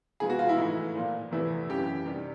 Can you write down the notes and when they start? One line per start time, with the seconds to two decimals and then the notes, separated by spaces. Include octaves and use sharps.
0.20 C3 F3 G#3 B3 G#4
0.30 F#4
0.39 F4
0.49 E4
0.57 A2 E3 A3 D#4
0.95 A#2 F3 A#3
1.32 E2 C3 E3 A3 E4
1.69 F#2 C#3 E3 G4
2.06 C3 D#3 G3